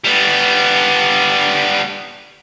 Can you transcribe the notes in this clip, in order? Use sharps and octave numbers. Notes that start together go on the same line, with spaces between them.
G3 B3